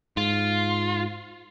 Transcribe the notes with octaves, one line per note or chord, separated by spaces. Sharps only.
G#2 F4